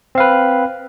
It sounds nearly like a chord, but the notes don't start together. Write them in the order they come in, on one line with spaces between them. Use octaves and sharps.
C4 F5 B4